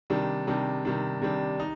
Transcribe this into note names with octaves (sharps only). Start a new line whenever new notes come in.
C3 D#3 G3 D4
C3 D#3 G3 D4
C3 D#3 G3 D4
C3 D#3 G3 D4
D#4